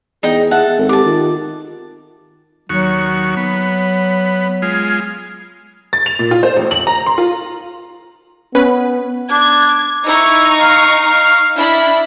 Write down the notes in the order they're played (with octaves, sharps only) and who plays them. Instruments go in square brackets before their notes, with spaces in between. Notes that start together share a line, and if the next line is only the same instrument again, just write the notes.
[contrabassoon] E2 [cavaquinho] D#4 D#5 G5 [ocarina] G#4
[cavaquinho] E5 F#5 A5
[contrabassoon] G#1 [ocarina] A4
[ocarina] G4 [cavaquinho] A5 D6
[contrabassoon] D#3 [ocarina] F4
[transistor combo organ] D#2 F#4 C#6 [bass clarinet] F#3
[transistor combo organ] B3
G#3 F4
[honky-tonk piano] A6
F7
A#2
F4
C5
A1
F#7
A#5
C6
F4
[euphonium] B3 [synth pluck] C#4 B4
[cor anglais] D4 [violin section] G#6
[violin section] D#4 A#5 C#6 [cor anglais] E4
[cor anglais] F5
[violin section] D4 E4 B5